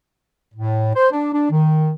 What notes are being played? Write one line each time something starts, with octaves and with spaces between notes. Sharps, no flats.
A2
C5
D4
D4
D#3